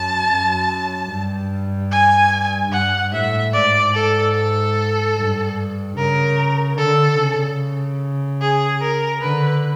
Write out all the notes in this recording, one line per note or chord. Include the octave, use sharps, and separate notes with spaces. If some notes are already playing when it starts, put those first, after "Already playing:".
Already playing: F#2 A5
F#2
G2
G#5
G2 F#5
A2 E5
G#2 D5
A4
A4
G2
C#3 A#4
D3 A4
C#3
G#4
A#4
D3 B4